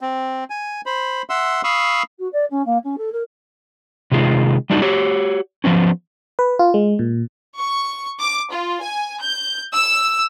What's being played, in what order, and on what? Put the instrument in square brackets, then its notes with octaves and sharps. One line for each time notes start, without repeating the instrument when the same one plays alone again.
[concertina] C4
G#5
C5 B5
E5 F#5 C6 E6
F5 B5 C#6 D#6 E6
[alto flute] F#4
D5
C#4
A#3
C#4
A4
A#4
[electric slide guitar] C3 D#3 G#3 F4
G3 A3 D4 D#4 F#4
F#4 G4 C#5
F3 F#3 B3 C#4
[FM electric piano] B4
F4
G#3
A#2
[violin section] C#6
D6
F4
G#5
G6
E6